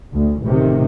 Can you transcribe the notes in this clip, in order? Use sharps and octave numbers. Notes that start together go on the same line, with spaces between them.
D2
A1 C3 D#3